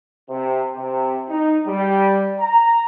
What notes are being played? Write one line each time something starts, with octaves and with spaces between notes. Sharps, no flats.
C3
C3
D#4
G3
A#5